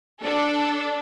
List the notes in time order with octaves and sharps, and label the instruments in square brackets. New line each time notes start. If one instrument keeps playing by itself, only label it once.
[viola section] D4 [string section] A4